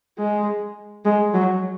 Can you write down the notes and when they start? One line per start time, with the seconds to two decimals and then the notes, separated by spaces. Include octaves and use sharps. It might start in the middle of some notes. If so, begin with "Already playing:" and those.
0.19 G#3
1.05 G#3
1.34 F#3